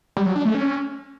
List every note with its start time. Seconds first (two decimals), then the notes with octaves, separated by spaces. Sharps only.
0.17 G3
0.26 F#3
0.36 D4
0.45 A3
0.55 C#4